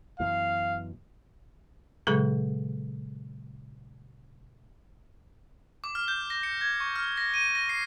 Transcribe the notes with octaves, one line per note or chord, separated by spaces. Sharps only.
F#2 B2 E3 F5
A#2 C#3 F#3 G#3 G#4 A4
D6
F6
G6
A#6
C#7
G#6
C#6
F6
A#6
D#7
A#6
C7